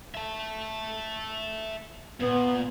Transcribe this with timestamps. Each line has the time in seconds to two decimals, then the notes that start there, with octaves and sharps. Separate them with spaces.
0.15 E5 A5
2.20 A#2 B3